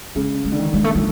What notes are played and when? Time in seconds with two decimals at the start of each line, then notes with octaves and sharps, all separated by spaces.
0.15 C#3 G#3
0.45 G#3
0.52 D3
0.59 D#3
0.74 G#3
0.84 A3
0.95 F3 G#3